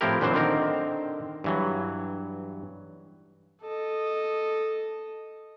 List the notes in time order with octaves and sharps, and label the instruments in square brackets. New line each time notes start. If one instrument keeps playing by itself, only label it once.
[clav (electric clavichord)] A2 F3 C4 E4 G4 A#4
A#2 D3 E3 F#3 C4 C5
D3 D#3 C4 A#4
G2 E3 F#3
[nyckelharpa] A4 D#5